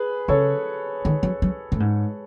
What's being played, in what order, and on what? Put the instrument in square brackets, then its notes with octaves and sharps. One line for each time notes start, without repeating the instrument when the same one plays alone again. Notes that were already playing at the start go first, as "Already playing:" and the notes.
Already playing: [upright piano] G#4 B4
[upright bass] C#3 [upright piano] A4 C#5
[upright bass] D#3
F#3
F#3
A2
G#2